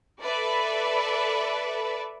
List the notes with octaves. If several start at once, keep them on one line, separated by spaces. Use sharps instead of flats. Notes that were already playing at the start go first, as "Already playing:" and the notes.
A4 B4 D5 E5